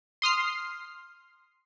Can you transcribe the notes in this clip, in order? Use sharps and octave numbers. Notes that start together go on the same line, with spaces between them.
C6 D#6 F6 C7